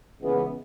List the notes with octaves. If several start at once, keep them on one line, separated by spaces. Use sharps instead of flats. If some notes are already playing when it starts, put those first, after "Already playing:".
C#2 C#3 E3 G#3 B3